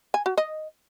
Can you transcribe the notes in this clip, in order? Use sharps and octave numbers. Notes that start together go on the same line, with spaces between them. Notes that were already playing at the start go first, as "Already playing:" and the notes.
G#5
F#4
D#5